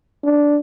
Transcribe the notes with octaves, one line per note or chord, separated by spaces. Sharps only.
D4